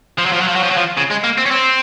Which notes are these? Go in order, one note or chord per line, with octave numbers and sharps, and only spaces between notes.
F3
F#3
F3
F#3
F3
F#3
F3
F#3
F3
C#3
G#3
A#3
C4
C#4
C4